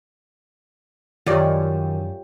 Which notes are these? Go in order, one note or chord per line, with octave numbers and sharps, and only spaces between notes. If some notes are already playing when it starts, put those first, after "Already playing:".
F#2 D#3 F4 G4 C#5 D5